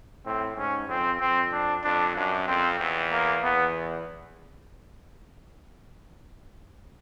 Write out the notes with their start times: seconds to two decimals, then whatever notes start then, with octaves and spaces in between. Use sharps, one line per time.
0.26 A2 C4
0.57 G#2 C#4
0.88 F2 C4
1.20 F2 C4
1.52 D4
1.84 F2 D4
2.16 F#2 D4
2.47 F2 C4
2.80 E2
3.12 A#3
3.43 E2 B3